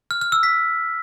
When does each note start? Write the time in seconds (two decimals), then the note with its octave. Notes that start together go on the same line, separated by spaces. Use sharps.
0.11 F6
0.21 F6
0.32 E6
0.43 B6